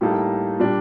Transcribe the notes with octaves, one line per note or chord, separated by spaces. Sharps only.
A2 G3 A#3 D#4 A4
A#2 G3 D4